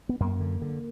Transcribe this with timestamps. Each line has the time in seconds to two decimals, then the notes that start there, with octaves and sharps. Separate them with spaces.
0.09 B3
0.20 F#2 A#3
0.40 D3
0.62 D3